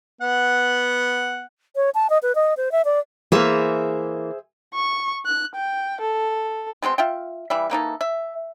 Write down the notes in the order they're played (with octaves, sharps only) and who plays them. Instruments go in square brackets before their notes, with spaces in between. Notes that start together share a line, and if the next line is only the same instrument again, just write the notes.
[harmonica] B3 F#5
[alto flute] C#5
A5
D#5
B4
D#5
C5
E5
D5
[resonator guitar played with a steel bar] E3 A#3 [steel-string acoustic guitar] G#4 C5 E5
[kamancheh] C#6
F#6
G5
A4
[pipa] B2 G#3 C4 C6
F4 E5 G5
E3 G3 E5
E3 A#3 D#4 A4
E5